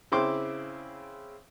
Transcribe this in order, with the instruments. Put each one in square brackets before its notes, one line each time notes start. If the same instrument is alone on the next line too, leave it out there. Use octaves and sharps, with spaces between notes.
[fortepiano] C#3 C4 E4 G5 C6 D6